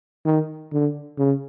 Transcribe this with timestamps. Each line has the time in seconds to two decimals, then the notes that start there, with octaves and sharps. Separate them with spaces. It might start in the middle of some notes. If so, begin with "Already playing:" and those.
0.26 D#3
0.72 D3
1.18 C#3